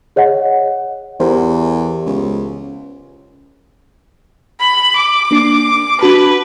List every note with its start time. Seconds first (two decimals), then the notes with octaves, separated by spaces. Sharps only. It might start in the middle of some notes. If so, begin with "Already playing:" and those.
0.16 G#4 C#5 D#5 F#5
1.20 E2 G4 A#4 C5
2.06 C#2
4.60 B5
4.96 D6
5.31 A#3 D4 C7
6.01 D4 F#4 B4 A5